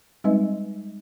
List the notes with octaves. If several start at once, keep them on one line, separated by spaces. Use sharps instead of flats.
G3 G#3 C4 D#4 B4 D#5